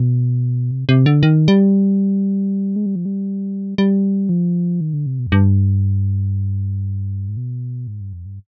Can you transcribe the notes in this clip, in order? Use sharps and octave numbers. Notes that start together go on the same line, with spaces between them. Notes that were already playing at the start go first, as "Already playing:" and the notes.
Already playing: B2
C3
C3
D3
D#3
G3
G#3
G3
F3
G3
G3
F3
D#3
D3
C3
B2
F2
G2
G#2
B2
G#2
G2
F2
G2